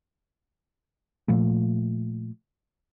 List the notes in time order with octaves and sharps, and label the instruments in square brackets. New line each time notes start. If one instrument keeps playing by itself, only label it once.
[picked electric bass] A#2 F3 A3